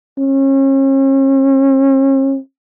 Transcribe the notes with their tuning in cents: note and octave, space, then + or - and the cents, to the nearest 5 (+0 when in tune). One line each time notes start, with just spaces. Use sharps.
C#4 -40